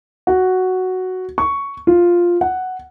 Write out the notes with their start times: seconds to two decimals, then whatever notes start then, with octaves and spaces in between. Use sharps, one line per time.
0.27 F#4
1.38 C#6
1.87 F4
2.41 F#5